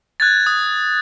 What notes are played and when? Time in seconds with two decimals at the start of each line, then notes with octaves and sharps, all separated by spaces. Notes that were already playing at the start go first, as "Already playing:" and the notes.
0.20 F#6 G#6 A6
0.46 D#6